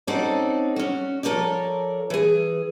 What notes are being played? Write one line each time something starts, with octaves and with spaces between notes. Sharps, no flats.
C4 C#4 D#4 F#4 A4 D5
C#4 F#4
F3 A4 A#4 C#5 D5
E3 G#4